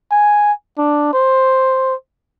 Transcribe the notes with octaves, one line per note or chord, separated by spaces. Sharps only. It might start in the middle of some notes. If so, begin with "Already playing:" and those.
G#5
D4
C5